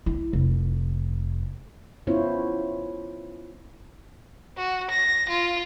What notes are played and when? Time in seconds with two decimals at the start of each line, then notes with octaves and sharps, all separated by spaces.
0.06 E4
0.33 F1
2.07 B3 C#4 E4 F4 C5 C#5
4.57 F#4
4.90 A#6
5.29 F4